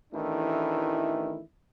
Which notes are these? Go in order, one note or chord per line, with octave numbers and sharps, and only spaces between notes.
A1 D#3 E3 A3 D4 E4